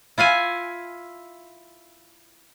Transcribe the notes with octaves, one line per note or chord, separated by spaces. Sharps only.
E4 F4 F5 G#5